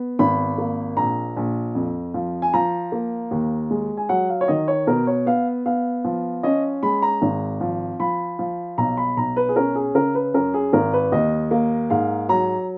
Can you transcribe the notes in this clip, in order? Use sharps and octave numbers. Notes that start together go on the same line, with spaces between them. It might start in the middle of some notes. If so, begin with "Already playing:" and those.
Already playing: B3
G#1 B5
A#3
A#1 A#5
A#1
F2
F3
G#5
F3 A#5
A#3
D#2
G#3
G#5
F#3 F#5
F5
C#5
D#3 D#5
C#5
B2 A#4
C#5
B3 F5
B3 F5
F3
C#4 D#5
G#3 B5
A#5
G#1
F3
F3 B5
F3
B1 A#5
B5
B1 A#5
B4
G#4
C#4 A#4
G#4
C#3 A#4
B4
F#2 A#4
G#4
G#1 A#4
B4
D#2 D#5
A#3
G#2 F5
F#3 A#5